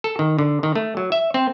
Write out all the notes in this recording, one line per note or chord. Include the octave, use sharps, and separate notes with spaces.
A4
D#3
D3
D#3
A3
F#3
E5
C4